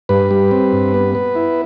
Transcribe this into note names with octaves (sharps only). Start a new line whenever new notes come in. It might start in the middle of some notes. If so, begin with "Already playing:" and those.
G2 B4
G3
C4
G2
B3
B3
E4